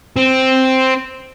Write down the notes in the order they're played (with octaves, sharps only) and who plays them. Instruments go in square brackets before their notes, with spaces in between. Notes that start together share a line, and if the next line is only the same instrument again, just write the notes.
[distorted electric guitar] C4